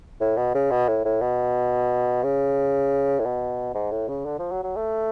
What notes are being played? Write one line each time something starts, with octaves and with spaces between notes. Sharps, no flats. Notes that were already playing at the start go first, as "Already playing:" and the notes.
A2
B2
C#3
B2
A2
A2
B2
C#3
A2
B2
G#2
A2
C#3
D3
F3
F#3
F#3
A3